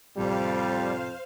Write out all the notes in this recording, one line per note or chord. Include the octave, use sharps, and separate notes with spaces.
A1 F2 C3 G3 C5 F5